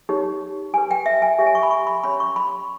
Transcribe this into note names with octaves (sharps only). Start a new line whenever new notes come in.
D#4 G4 C#5
G4 B4 G#5
G5
E5
G#5
G4 C#5 E5
G#5
C#6
B5
C#6
B5
C#4 G4 C#5 B5
C#6
B5